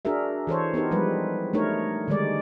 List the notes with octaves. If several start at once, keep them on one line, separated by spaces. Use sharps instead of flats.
D4 F#4 G#4 A#4 E5
E3 A4 C5 C#5
B3 D#4 G4 A#4
F3 G3 G#3 B4
A3 D4 D#4 A#4 C#5
D3 D#3 G3 G#3 D5